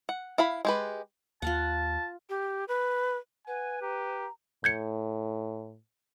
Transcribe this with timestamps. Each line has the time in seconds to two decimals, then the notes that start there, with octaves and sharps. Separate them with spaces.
0.09 F#5
0.38 E4 F5 B5
0.65 G#3 G4 B4
1.42 D#2 F4 F5 F#5 A5
2.29 G4
2.68 B4
3.47 B4 F#5 G#5
3.82 G4 A#5
4.64 A2 G6 G#6 C#7